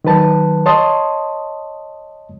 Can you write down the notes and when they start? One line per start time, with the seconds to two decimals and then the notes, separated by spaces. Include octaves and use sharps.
0.04 D#3 F#3 B4 A5
0.66 C#5 D#5 A5 C6 D#6